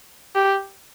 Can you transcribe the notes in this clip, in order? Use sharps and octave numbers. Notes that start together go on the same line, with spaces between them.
G4